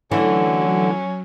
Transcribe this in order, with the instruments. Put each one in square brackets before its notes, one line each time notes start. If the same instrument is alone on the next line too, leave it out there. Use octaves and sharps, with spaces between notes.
[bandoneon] D3 [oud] E3 A3 E4 [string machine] F#3 [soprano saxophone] C#4